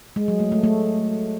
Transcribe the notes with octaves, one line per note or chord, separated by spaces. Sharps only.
G#3
F#3
A3
A3
A3